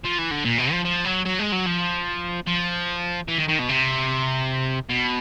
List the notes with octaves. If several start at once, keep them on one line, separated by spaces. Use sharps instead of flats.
F3
E3
D3
A#2
B2
F3
F3
F#3
F#3
G#3
F#3
F3
F3
E3
D#3
D#3
B2
C3
B2